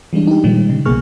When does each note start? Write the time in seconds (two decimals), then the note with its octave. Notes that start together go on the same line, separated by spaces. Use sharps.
0.13 E3 G3 G#3 D4
0.27 D#4 G4
0.44 A#2 D#3 F3 G3 G#3
0.70 C#3
0.86 B1 B2 A#3 G#4 C#6 F6